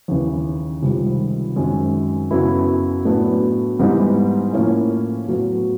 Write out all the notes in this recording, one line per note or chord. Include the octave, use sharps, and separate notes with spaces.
D#2 C#3 E3
C#2 C3 D#3 G3
F#2 D#3 G#3 C4
F#2 C#3 F#3 B3 E4
A2 F#3 B3 D4
G#2 E3 G3 B3 D#4
A2 F3 A#3 C#4 E4
A2 F#3 B3